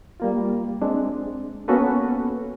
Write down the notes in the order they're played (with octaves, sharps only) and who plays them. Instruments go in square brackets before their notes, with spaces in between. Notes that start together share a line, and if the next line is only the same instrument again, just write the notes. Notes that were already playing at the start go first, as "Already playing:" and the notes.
[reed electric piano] G3 A#3 F4
G#3 C4 D4
A#3 B3 C#4 F#4 A4 B4